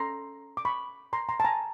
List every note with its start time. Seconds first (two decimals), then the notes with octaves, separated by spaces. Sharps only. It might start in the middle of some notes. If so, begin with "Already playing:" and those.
Already playing: C#4 A4 A#5 C6
0.57 D6
0.65 B5 C#6
1.13 A#5 C6
1.29 A#5 C6
1.40 A5
1.45 G#5 A#5